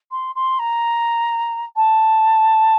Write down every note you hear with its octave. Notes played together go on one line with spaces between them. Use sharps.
C6
C6
A#5
A5